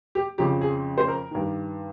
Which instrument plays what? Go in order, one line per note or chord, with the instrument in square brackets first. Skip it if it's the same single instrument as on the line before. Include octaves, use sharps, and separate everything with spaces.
[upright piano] G4
F2 C#3 F3 G4
G#4
C5
A#4
G2 D#3